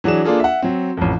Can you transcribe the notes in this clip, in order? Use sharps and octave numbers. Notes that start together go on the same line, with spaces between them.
E3 F#3 D4 G#4 E7
A#3 D4 F4 G#4 A4
E5 F#5
F#3 C4
A1 F2